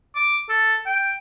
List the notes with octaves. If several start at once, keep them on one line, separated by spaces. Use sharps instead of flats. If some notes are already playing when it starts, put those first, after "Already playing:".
D6
A4
G5